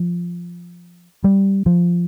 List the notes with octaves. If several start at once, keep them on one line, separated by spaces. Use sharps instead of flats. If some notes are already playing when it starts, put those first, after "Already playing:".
Already playing: F3
G3
F3